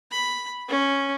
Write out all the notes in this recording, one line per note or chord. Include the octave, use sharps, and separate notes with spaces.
B5
C#4